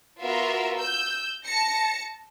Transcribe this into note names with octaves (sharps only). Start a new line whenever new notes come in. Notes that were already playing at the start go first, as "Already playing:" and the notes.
B3 F4 F#4 A#4 E5
E6 G6
A5 A#6 C#7